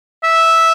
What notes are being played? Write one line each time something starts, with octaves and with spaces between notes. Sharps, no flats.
E5